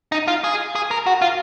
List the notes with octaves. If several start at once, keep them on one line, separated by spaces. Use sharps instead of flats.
D#4
F4
G#4
G#4
A#4
F#4
F4